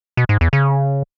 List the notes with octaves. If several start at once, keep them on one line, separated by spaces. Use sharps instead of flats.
B2
G#2
E2
C#3